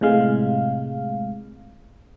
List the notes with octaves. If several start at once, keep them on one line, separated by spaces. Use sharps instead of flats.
A2 C3 G#3 F5